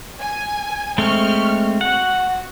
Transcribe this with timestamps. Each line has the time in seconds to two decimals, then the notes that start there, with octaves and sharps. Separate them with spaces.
0.20 G#5
0.98 G#3 A3 C4 C#6 F6
1.81 F#4 F#5